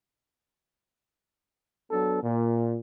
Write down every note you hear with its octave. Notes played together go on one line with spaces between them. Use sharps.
F#3 B3 D4 A4
A#2